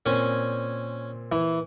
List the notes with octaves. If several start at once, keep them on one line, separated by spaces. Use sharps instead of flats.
A#2 C4 C#4 G#5
E3